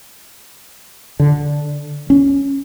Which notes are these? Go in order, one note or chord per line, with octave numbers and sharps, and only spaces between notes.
D3
C#4